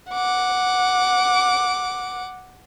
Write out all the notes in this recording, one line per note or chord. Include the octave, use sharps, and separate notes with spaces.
F#5 D6